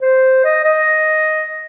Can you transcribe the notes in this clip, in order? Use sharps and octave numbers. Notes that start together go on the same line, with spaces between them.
C5
D#5
D#5